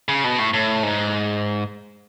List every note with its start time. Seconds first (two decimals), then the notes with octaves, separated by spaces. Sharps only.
0.08 C#3
0.24 B2
0.39 A2
0.54 A2
0.83 G#2